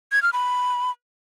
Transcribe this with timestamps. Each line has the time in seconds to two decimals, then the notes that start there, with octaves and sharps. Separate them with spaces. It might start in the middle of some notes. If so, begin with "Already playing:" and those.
0.12 G#6
0.22 F6
0.33 B5